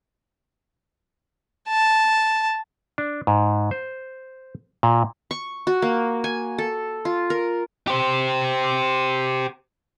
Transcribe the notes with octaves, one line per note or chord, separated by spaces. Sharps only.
A5
D4
G#2
C5
A#2
C#6
F#4
A#3
G#5
A4
F4
A#4
G4 C5